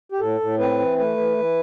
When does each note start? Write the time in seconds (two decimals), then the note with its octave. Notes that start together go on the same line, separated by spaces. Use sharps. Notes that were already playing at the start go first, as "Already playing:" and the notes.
0.12 G4
0.20 A2 A4
0.40 A2
0.59 C4 B4
0.79 E3
0.98 A3 B4
1.17 E3
1.37 E3